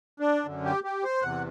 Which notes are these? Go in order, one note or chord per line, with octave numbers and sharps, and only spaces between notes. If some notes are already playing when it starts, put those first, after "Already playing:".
D4
F#2 D3
G4
G4
C5
E2 C3 E3 F#5